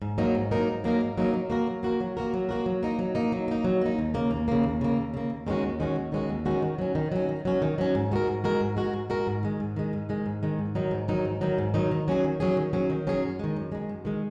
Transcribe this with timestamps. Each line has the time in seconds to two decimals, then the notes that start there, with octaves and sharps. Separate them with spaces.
0.02 G#2
0.18 F#3 A#3 D#4 A#4
0.35 G#2
0.51 F#3 A#3 D#4 A#4
0.68 G#2
0.84 F#3 A#3 D#4 A#4
1.01 G#2
1.18 F#3 A#3 D#4 A#4
1.34 F#3
1.50 A#3 F#4 A#4
1.67 F#3
1.83 A#3 F#4 A#4
2.00 F#3
2.17 A#3 F#4 A#4
2.34 F#3
2.49 A#3 F#4 A#4
2.66 F#3
2.83 A#3 D#4
2.99 F#3
3.15 A#3 D#4
3.32 F#3
3.48 A#3 D#4
3.64 F#3
3.81 A#3 D#4
3.99 D#2
4.14 C#3 A#3
4.31 D#2
4.48 C#3 A#3
4.64 D#2
4.81 C#3 A#3
4.97 D#2
5.14 C#3 A#3
5.30 D#2
5.47 D#3 G#3 C#4 F#4
5.63 D#2
5.80 D#3 G#3 C#4 F#4
5.96 D#2
6.12 D#3 G#3 C#4 F#4
6.29 D#2
6.45 D#3 G#3 C#4 F#4
6.62 D#3
6.78 F#3 C#4
6.95 D#3
7.12 F#3 C#4
7.29 D#3
7.45 F#3 C#4
7.62 D#3
7.78 F#3 C#4
7.95 G#2
8.12 G#3 F#4 A#4
8.27 G#2
8.44 G#3 F#4 A#4
8.61 G#2
8.77 G#3 F#4 A#4
8.93 G#2
9.10 G#3 F#4 A#4
9.27 G#2
9.43 D#3 G#3
9.60 G#2
9.76 D#3 G#3
9.93 G#2
10.09 D#3 G#3
10.26 G#2
10.43 D#3 G#3
10.59 G#2
10.75 D#3 F#3 D#4
10.91 G#2
11.08 D#3 F#3 D#4
11.25 G#2
11.41 D#3 F#3 D#4
11.58 G#2
11.74 D#3 F#3 D#4
11.91 D#3
12.08 F#3 C#4 G#4
12.24 D#3
12.40 F#3 C#4 G#4
12.57 D#3
12.73 F#3 C#4 G#4
12.90 D#3
13.07 F#3 C#4 G#4
13.23 F#2
13.39 D#3 G#3
13.57 F#2
13.72 D#3 G#3
13.89 F#2
14.05 D#3 G#3